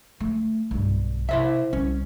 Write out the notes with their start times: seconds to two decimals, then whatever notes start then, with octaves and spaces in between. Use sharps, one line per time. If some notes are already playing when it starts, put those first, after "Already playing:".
0.20 A3
0.71 B1 G2
1.29 C3 E4 C5 E5
1.73 C2 C#4